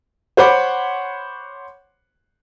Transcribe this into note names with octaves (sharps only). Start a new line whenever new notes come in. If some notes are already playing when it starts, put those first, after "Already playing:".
C5 C#5 F#5 B5 C6 D6